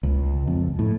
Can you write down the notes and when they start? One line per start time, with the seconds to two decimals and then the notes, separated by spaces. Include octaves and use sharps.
0.03 C#2
0.47 F2
0.79 A2